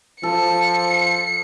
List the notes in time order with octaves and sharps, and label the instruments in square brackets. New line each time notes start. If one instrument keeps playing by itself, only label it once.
[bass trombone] F3 [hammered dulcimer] A4 [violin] C#7